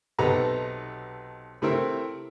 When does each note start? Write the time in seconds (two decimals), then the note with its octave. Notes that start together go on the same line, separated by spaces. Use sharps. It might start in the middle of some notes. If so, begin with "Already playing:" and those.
0.18 B1 C3 D#4 A4 B4 A#5
1.62 C3 A3 C4 E4 A#4